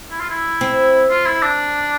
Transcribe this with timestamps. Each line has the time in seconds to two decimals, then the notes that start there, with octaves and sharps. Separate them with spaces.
0.11 E4
0.20 F4
0.30 E4
0.61 C4
1.10 F4
1.26 E4
1.42 D4